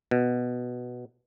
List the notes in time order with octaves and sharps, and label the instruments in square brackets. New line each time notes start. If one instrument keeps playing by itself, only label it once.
[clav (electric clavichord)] B2